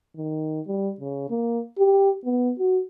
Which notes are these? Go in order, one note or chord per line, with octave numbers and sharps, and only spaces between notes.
D#3
G3
C#3
A#3
G4
B3
F#4